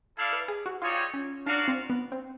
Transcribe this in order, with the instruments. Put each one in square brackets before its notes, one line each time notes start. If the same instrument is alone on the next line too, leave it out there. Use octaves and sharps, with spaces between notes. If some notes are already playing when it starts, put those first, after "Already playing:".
[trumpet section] E4 A4 D5 F5
[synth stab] B4
G#4
F#4
[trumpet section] G3 C4 D#4 G#4 C#5 [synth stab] F4
[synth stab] C#4
[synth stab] D4 [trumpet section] F#4 A#4 D5 F5
[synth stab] C4
B3
C4